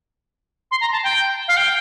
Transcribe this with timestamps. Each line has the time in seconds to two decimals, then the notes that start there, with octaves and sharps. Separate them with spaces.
0.71 C6
0.81 A#5
0.92 A5
1.03 G5
1.48 F5
1.57 G5